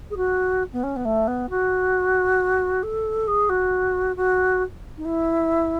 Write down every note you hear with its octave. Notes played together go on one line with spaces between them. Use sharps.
G#4
F#4
B3
C#4
B3
A3
B3
F#4
A4
G#4
F#4
F#4
D#4
E4